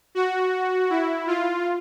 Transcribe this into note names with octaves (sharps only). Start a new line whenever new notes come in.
F#4
E4
F4